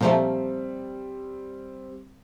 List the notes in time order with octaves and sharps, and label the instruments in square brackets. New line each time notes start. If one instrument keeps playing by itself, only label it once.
[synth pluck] A#2 F3 A3 [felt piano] G3 C4